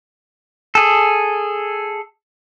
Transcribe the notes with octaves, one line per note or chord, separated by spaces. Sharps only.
G#4 A4